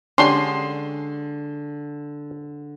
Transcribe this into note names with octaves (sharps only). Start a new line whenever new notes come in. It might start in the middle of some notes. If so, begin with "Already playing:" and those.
D3 G#3 C#4 D4 G4 C6